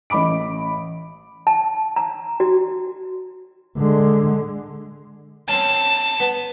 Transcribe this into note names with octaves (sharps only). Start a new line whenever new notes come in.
A1 D#5 B5 D6 D7
A5
A#5
F#4
D3 G#3
C4 C#4 A5
B3